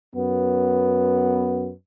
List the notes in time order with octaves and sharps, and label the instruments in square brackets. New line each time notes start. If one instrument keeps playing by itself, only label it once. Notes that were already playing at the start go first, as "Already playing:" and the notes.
[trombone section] F#2 B3